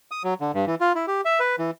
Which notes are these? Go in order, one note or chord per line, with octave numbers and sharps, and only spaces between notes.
D#6
F#3
D3
G2
E3
F4
E4
G4
E5
B4
E3